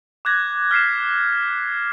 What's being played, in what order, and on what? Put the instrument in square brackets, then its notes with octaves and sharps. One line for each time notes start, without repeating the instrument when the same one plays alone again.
[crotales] D6 F#6 G#6 A#6
F6 B6 C7 E7